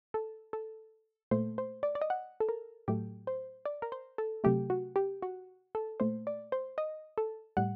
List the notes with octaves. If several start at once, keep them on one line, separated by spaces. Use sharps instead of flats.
A4
A4
A#2 A3 C5
C5
D5
D5
D#5
F#5
A4
A#4
A2 F#3 A3 G4
C5
D5
A#4
C5
A4
C3 F#3 A3 G4
F#4
G4
F#4
A4
A#2 A3 C5
D5
C5
D#5
A4
A2 G3 F#5